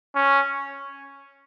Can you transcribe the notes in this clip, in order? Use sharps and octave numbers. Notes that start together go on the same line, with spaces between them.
C#4